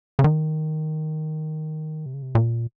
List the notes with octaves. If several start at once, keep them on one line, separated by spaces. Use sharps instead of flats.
C#3
D#3
C3
C#3
C3
A#2